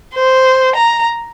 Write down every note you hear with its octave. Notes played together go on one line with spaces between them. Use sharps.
C5
A#5